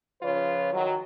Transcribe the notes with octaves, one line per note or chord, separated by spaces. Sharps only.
C#3 F3 F4 B4 C#5
D#3 F#3